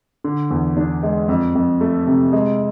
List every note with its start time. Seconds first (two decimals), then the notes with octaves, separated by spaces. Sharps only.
0.24 D3
0.51 E2
0.77 D4
1.03 G#3
1.28 F2
1.55 F2
1.81 A3
2.07 C3
2.32 G#3